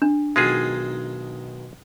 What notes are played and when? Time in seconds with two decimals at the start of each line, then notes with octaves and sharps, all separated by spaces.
0.02 D4
0.36 B1 B2 D#3 G#3 F4 G#4